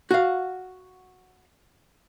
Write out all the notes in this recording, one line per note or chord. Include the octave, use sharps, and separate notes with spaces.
F#4 F5